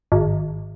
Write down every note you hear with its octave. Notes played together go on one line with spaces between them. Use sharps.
G#1